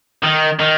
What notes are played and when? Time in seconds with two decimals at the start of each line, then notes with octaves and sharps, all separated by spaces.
0.24 D#3
0.60 D#3